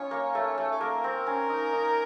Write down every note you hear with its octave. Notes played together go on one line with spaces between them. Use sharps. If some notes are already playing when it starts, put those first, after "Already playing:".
Already playing: C#4 D#4 F4 C#5
A#3
A3
A3
A4
A#3 A#4
C4
C#4
D#4
D#4